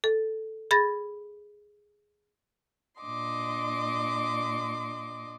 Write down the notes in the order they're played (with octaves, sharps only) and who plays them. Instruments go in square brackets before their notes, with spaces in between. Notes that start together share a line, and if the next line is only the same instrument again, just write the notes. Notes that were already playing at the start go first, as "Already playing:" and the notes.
[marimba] A4
G#4 B5 A6 A#6
[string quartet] A#2 D4 D#5 C6 D6